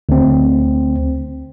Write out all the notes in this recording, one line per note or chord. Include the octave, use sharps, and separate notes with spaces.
D2 C4